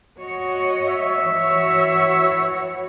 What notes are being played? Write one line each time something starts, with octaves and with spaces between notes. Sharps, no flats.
F#4 C#5 D#5
E5
E3 F#4 C#5